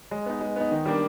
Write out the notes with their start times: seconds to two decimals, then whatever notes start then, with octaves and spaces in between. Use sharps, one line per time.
0.11 G#3
0.26 B3 D#4
0.41 G#3
0.56 B3 D#4
0.71 D#3
0.85 G3 A#3 D4